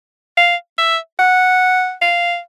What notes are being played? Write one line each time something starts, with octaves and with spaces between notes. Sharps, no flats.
F5
E5
F#5
F5